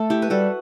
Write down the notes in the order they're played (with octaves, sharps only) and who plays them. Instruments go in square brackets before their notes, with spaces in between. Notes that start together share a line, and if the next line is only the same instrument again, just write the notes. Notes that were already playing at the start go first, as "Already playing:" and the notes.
Already playing: [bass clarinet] A3 [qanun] A4
[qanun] E4 G4
B4
[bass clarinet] G3 [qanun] F#4 A4